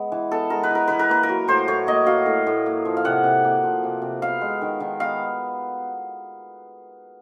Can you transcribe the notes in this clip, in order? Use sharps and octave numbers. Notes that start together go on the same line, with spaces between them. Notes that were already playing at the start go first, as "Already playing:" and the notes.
Already playing: G#3 B3
E3
B3 A4
G#3 A#4
B4
E3 A#4
E3 B4
A#4
A#3 B4
A#4
F#3
A2 C5
A2 C#5
A#3 D#5
F#3 F5
A2
A2
A#3
F3
F5
C3 F#5
C3
A#3
F3
C3
C3
B3 F5
G#3
D#3
D#3
B3 F5